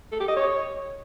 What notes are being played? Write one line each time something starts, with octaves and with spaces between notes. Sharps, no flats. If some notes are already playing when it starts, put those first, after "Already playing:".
A4
G4
D#5
C#5